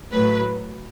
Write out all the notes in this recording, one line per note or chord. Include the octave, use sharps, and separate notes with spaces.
A2 F#3 A3 B4